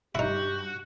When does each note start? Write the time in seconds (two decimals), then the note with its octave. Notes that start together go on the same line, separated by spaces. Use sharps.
0.15 G2 D#4 E4 F#4 G4